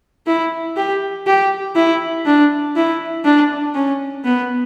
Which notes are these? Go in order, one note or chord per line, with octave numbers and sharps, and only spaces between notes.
E4
G4
G4
E4
D4
E4
D4
C#4
B3